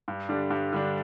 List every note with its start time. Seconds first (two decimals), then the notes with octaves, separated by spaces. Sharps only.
0.08 G2
0.29 D3 G3 D4
0.50 G2
0.73 D3 G3 D4